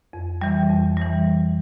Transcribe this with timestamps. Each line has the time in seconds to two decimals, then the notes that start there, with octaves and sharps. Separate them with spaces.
0.13 F2
0.41 E3 G3
0.70 F2
0.97 E3 G3